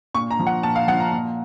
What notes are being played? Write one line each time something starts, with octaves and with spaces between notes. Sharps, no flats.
A#2 C#6
A#5
F3
F#5
A#2 A5
F5
F3 F#5
A#5
A#2